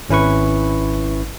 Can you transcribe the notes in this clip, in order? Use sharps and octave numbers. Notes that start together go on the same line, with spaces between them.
G#1 C#4 E4 B4 C#6